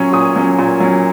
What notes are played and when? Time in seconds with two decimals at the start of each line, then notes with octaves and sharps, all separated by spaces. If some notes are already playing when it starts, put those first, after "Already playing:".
Already playing: A#2 F#3 C#4 C#6
0.13 A#2 D#6
0.36 F#3 C#4
0.59 A#2
0.80 F#3 C#4